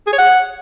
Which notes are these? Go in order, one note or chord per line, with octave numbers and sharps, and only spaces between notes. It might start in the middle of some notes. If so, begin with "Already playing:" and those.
G#4
C#5
F#5